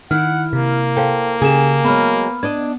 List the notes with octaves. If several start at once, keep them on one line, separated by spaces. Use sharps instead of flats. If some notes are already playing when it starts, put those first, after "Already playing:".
D#3 E4 F#5 F6
C3 A#3
A4 C5 F5 G5
C#3 G4 G#4 G#5 E7
F#3 G#3 B3 B5 F6
D4 D5 D#5 G#6